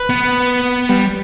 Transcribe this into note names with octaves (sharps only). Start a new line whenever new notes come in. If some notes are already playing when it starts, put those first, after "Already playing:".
Already playing: B4
B3
G3